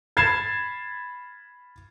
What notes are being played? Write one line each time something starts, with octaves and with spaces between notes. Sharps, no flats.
B5 G#6 A6 C7 E7